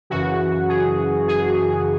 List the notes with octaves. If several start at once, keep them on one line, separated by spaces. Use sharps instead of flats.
F#2 C#3 E3 F#4
G#4
G#4